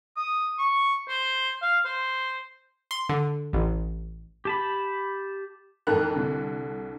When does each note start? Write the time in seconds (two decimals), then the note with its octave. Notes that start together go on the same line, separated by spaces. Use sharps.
0.17 D#6
0.58 C#6
1.09 C5
1.62 F5
1.85 C5
2.91 C6
3.09 D3
3.53 A1
4.45 G4 A5 B5
5.87 A1 F2 G#2 A4 A#4 F#6
6.15 C2 D3